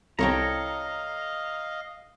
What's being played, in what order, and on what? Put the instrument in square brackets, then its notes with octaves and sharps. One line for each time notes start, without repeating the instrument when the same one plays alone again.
[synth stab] C2 [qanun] A4 C#5 G5 [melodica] D#5 F5 [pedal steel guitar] A#5